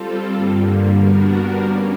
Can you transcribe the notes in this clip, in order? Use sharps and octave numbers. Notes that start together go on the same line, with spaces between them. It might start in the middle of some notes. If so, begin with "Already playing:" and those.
Already playing: G3 C4 F4 A4
G2 D3 G3 A#3
G3 B3 D4 F#4 A#4
G3 A#3 C#4